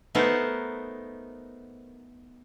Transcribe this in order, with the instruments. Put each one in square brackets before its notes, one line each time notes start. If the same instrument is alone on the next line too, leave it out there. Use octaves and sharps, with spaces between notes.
[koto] A3 B3 D#4 A4 A#4 C5